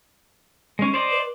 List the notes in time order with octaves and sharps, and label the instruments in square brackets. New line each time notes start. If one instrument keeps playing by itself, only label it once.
[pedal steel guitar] G#3 C#4
C5 D5 D#5
[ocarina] B4